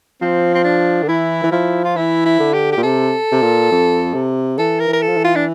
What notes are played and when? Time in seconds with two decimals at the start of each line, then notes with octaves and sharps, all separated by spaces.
0.21 F3 C4
0.55 C4
0.64 D4
1.02 D3
1.08 E3 E4
1.43 E3
1.51 F3 E4
1.85 F4
1.96 E3 E4
2.26 E4
2.39 D3
2.53 G4
2.72 A#2 G4
2.83 C3 A4
3.32 C3
3.42 A#2
3.71 F2
4.14 C3
4.58 E3 A4
4.80 A#4
4.87 E3
4.93 A#4
5.02 A4
5.08 F3
5.17 E3
5.24 F4
5.36 D4